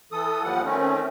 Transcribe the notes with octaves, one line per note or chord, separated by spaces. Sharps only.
E3 A4 D#6
D#2 F3 G3 F#5
D#3 A3 C4 C#4